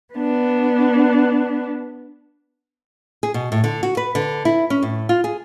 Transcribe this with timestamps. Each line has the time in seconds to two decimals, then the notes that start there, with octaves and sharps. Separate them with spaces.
0.14 B3 D4
3.23 G#4
3.34 B2
3.52 A2
3.64 D3
3.83 F#4
3.97 B4
4.15 D3
4.45 E4
4.70 C#4
4.82 A2
5.09 F4
5.24 G#4